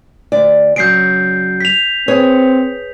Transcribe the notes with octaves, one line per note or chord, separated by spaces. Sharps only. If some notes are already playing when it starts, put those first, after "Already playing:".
D2 D5
C#3 F#3 G6 C7 D7
B6 F7
C4 G#4 B4 C#5